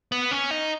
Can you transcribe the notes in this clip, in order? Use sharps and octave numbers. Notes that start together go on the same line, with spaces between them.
B3
C#4
D#4